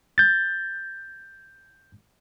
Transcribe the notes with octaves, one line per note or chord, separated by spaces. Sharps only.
G6 A6